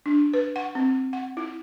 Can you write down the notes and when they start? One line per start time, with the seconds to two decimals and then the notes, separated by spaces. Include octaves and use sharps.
0.06 D4
0.34 B4
0.56 F#5
0.75 C4
1.13 F#5
1.37 E4